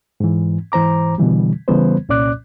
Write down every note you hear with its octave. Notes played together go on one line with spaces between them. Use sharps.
G#2 E3
G#2 E3 C5 A#5 D6
B2 D3 E3 G3
C#3 E3 G3 B3 B4 C5
C2 A#2 C#4 D5 D6 F#6